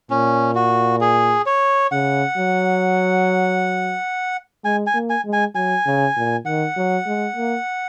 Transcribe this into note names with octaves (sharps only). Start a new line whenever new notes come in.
A#2 C#4
F#4
G#4
C#5
C#3 F#5
F#3
G#3 G#5
G#5
A#3
G#5
G#3
G#5
F#3 G#5
C#3
A#2
D#3 F#5
F#3
G#3
A#3